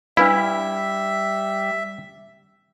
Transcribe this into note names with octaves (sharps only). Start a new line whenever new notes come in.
G3 D4 E4 B4 E5 F5